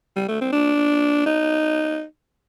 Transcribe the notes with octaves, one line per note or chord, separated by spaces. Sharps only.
G3
A3
C4
D4
D#4